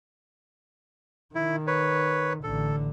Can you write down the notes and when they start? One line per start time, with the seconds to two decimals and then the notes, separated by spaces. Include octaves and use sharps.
1.35 D#3 E4
1.67 B4 C#5
2.43 A1 D3 A4